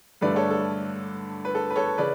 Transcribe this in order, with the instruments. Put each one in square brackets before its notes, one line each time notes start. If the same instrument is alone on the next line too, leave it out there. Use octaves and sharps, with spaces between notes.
[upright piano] G2 D3 A3 B4 D5
A4 C#5
A4
B4
A4
B4
A4 C#5
C#3 B4 D5